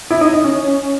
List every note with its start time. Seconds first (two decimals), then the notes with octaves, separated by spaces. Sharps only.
0.10 E4
0.21 D#4
0.33 D#4
0.44 C#4